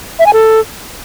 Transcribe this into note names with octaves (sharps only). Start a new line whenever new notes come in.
E5
G#5
A4